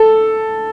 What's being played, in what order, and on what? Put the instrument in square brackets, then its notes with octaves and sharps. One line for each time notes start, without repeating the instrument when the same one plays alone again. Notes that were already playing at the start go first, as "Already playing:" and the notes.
Already playing: [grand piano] A4